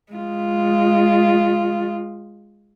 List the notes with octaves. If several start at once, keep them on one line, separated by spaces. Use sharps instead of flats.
G#3 F4